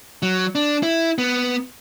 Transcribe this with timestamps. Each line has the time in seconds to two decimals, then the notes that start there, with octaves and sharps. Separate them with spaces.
0.22 F#3
0.55 D4
0.83 E4
1.18 B3